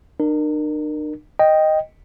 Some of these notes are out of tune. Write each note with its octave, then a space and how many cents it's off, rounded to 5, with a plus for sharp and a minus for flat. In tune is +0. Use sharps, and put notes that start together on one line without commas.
D4 +45 A#4 +0
D#5 +0 G5 +0